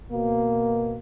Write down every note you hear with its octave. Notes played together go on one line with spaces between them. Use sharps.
B2 A#3